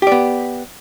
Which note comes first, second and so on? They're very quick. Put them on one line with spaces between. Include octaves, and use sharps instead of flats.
G4 D5 B3